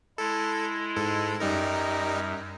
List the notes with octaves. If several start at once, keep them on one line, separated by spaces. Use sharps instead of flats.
G#3 E4 A4
G#2 A4
F#2 G3 D#4 A#4